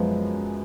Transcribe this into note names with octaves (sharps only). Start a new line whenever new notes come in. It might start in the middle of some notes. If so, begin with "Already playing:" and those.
Already playing: F#2 F3 G#3 B3